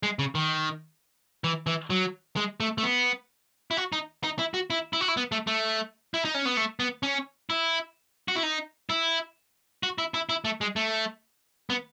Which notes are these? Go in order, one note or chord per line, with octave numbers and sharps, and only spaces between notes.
G#3
C#3
D#3
E3
E3
F#3
G#3
A3
A3
B3
E4
F#4
D#4
D#4
E4
F#4
E4
E4
F#4
E4
B3
A3
A3
E4
D#4
C#4
B3
A3
B3
C#4
E4
F#4
E4
D#4
E4
F#4
E4
E4
E4
A3
G#3
A3
B3